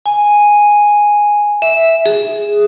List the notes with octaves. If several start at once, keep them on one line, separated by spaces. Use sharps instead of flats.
G#5
E5
G#4